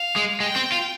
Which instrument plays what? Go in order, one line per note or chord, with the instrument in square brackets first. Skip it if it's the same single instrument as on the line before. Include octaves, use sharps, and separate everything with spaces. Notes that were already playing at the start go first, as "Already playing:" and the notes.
Already playing: [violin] F5
[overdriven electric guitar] G#3
[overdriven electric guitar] G#3 [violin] G5
[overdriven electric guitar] C4
F4